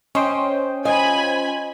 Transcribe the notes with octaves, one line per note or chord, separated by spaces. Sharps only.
C#4 C5 D#5 G5
F4 D#5 G#5 B5